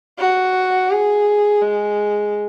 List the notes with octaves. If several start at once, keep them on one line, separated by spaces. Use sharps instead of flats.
F#4
G#4
G#3